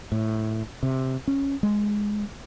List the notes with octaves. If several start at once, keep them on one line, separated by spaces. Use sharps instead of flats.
A2
C3
C#4
G#3